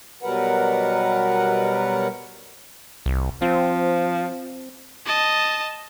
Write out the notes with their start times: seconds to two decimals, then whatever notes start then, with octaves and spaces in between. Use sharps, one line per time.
0.23 B2 F#3 G3 A#4 B4 F#5
3.06 C2
3.42 F3 C4
5.06 D#5 A5